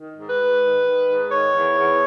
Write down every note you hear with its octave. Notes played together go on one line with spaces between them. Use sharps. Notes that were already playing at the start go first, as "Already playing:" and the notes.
Already playing: D#3
G#2
B4
G#2
D#3
D#3
G#2
D#3 C#5
E2
E2